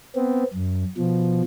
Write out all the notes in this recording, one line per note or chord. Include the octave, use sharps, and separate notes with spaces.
B3 C4
F#2
B2 F3